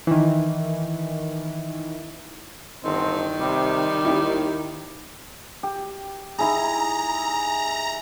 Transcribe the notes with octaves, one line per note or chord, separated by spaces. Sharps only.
D#3 E3
G1 D#3 C4
C3 G3
D#2 E4 G4
G4
D#4 E4 G#4 A#5